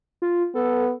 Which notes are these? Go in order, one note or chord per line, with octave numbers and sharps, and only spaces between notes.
F4
B3 A4